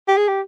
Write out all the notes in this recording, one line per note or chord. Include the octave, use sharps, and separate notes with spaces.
G4
G#4
G4